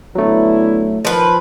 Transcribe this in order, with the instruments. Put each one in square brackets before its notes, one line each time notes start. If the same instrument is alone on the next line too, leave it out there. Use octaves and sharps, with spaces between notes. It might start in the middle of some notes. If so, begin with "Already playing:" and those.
[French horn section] D3 B3 E4 [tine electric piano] F#3 A3
[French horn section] D#3 [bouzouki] F3 B4